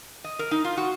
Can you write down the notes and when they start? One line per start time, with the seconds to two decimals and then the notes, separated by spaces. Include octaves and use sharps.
0.24 D#5
0.39 A#4
0.51 D#4
0.65 F4
0.77 F#4